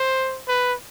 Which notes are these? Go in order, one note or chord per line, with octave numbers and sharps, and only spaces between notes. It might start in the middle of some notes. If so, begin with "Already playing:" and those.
Already playing: C5
B4